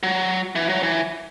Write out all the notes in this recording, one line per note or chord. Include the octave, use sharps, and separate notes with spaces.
F#3
E3
F#3
E3